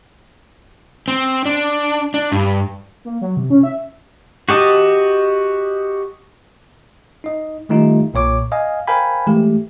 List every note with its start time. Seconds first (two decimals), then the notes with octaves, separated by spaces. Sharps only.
1.08 C4
1.45 D4
2.14 D4
2.32 G2
3.05 A#3
3.21 F#3
3.37 C3
3.50 C#4
3.63 E5
4.49 F#4 G4 D#5 A5
7.24 D#4 D#5
7.69 D#3 G3 A3 D#4 F4 G4
8.14 B1 A#2 C#5 D6
8.52 D#5 F5 G#5
8.87 A#4 C5 F5 G5 G#5 B5
9.27 E3 G#3 A3 G4